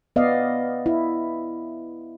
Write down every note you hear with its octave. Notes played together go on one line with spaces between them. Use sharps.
B3 D5 D#5 F5
E4